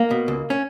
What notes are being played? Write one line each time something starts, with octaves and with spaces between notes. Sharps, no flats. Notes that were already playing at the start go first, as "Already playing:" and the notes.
Already playing: A#3
B2
C#2
C#4